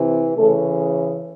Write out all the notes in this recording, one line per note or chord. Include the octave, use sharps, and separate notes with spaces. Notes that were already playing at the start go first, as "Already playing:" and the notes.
Already playing: C3 E3
C#3 E3 A3 A4